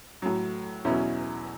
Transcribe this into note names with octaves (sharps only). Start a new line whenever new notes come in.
A2 F#3
E2 B2 F#3 C#4 E4